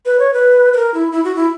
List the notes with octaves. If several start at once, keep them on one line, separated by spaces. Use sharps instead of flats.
B4
C#5
B4
B4
A#4
E4
E4
F#4
E4